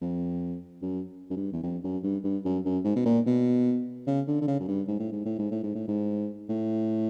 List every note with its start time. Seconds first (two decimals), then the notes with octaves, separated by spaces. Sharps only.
0.01 F2
0.82 F#2
1.30 F#2
1.36 G2
1.52 E2
1.63 F2
1.84 F#2
2.03 G2
2.24 G2
2.45 F#2
2.65 F#2
2.84 G#2
2.96 B2
3.06 A#2
3.26 B2
4.07 C#3
4.27 D3
4.41 D3
4.48 C#3
4.60 F#2
4.68 G2
4.88 G#2
4.99 A2
5.12 G#2
5.25 A2
5.38 G#2
5.51 A2
5.63 G#2
5.75 A2
5.88 G#2
6.49 A2